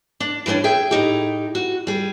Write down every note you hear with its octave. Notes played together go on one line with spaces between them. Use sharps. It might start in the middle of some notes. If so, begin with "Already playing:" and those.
D4
E3 G3 G#3 C#4 D4
G#4 E5 G5
A2 D#4 G4
F#4
G3 G#4